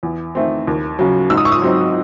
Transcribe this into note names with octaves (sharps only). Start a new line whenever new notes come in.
E2
D#3 A3 C4
D#2
C#3 F#3
G#2 E6
D#6
C#6
D#6
F#3 C4 D#4